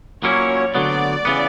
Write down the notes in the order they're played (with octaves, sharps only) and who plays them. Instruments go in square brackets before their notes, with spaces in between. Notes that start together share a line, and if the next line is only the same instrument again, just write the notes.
[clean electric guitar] A#2 F#3 A#3 C#4 E4 [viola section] C#5
[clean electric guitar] D2 D3 F#3 B3 [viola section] D5
[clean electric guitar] C#3 E3 B3